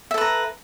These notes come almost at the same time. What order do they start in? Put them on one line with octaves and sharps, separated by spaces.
E5 A4 B4 A#5